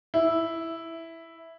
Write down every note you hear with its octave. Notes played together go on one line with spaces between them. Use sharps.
E4